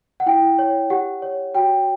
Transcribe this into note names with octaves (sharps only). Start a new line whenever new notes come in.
F#5
E4 G5
C#5
G4 F#5
C#5
F#4 G5